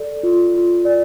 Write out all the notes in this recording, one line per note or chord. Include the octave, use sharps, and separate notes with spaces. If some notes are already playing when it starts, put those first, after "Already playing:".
Already playing: A4 D5
F4
F4
D5